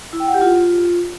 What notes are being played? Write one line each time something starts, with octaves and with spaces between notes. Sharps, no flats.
E4
G5
F#5
G4
F4